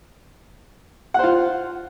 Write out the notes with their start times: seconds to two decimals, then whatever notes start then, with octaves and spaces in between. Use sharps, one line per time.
1.14 F#5
1.19 C5
1.24 F4